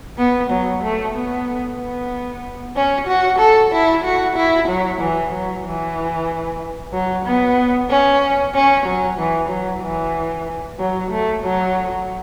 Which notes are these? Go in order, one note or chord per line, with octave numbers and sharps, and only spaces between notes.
B3
F#3
A3
B3
B3
C#4
F#4
A4
E4
F#4
E4
F#3
E3
F#3
E3
F#3
B3
C#4
C#4
F#3
E3
F#3
E3
F#3
A3
F#3